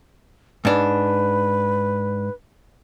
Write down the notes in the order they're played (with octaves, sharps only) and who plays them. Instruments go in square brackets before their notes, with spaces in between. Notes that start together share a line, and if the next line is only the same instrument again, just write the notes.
[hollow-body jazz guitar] G#2 D4 [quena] B4